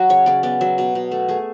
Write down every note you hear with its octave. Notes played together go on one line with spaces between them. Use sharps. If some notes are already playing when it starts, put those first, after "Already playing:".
Already playing: F#3 F#4
C#3 C#5
C#3 D5
B3 D5
F#3 E5
B2
B2
A3
A3 G#4